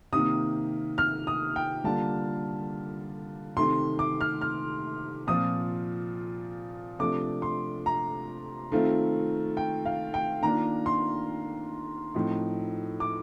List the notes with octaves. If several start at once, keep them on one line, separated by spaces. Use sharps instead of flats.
C3 D#3 A#3 D#6
F6
D#6
G5
D3 G3 A#3 F4 A5
C3 D#3 A3 C6
D6
F6
F6
A#2 F3 C4 F4 D#6
C3 F3 A3 D4 D6
C6
A#5
D#3 A3 C4 F4
G5
F5
G5
D#3 A#3 D4 F4 A#5
C6
A2 F3 C4 D#4
D6